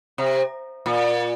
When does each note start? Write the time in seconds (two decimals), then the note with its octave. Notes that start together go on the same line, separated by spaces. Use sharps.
0.18 C3
0.86 A#2